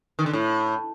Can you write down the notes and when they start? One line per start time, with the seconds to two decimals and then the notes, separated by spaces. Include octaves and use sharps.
0.19 D#3
0.26 D3
0.33 A2